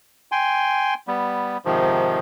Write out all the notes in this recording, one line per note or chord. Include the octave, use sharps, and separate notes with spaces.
G5 G#5 C6
G3 B3
G#2 C3 D#3 F3